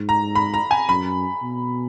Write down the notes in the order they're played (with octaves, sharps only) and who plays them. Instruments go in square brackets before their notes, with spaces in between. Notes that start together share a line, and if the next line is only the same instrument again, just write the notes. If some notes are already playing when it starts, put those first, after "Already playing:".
Already playing: [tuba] G#2
[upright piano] A#5
B5
A#5
G#5
[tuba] F#2 [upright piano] B5
[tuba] B2